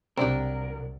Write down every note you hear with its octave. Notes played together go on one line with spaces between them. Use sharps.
C2 F#3 C4 D4 G4 A#4 G5